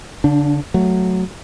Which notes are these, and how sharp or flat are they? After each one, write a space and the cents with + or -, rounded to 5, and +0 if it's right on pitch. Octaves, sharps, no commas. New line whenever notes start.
D3 -35 D4 +10
F#3 +0 A3 +0